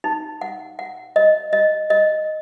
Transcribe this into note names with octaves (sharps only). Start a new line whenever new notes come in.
D#4
F#5
F#5
D#5
D#5
D#5